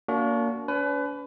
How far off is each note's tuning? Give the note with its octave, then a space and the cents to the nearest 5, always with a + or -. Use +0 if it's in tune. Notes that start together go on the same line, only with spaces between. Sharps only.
A#3 -5 D4 -35 F#4 +0
C#4 +45 B4 +25